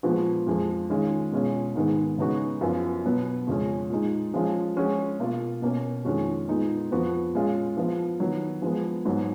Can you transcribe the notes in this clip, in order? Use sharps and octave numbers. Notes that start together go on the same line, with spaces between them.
A#2 F3 G#3 B3 F#4
F2 F3 G#3
D#3 G#3 C#4 F4
B2 G#3 C#4 F4
G#2 D#3 G#3 B3
C#3 G#3 B3 D#4 F#4
F#2 F3 B3 F4
B2 F#3 B3
F2 C#3 G#3 C#4
A#2 G#3 D#4
F3 G#3 C#4 F4
F3 G#3 C#4 F#4
B2 A#3 F4
B2 A#3 C#4
F2 D#3 G#3 C#4 F#4
A#2 G#3 B3 D#4
F2 F3 B3 F#4
A#2 G#3 C#4 F4
F3 B3 F4
D#3 F#3 B3
F3 G#3 B3
G#2 F#3 B3